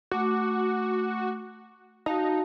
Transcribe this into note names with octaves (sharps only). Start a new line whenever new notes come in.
A3 F#4 D6
D#4 F#4 F5 A5